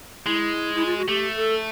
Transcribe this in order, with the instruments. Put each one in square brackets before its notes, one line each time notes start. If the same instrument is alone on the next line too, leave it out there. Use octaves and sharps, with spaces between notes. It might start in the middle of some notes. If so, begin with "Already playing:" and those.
[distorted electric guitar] G#3 [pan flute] E4
[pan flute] E4
F4
F#4
[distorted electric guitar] A3 [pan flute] G4
[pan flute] A4